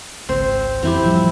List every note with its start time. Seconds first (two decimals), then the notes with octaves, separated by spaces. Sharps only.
0.29 G#1 C#2 C4 C5
0.83 F2 E3 C4 E4 G4
1.04 A2 F3 G3